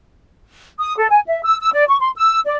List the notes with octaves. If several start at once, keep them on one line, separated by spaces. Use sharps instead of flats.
D#6
A4
G#5
E5
E6
E6
D5
C#6
C6
E6
D5